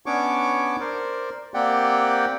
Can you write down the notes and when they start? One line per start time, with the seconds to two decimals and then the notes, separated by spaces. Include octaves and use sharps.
0.06 B3 C#4 D4 C#5 C#6 D6
0.80 A#4 C5 D5
1.54 A#3 C4 G4 D5 F#5 G5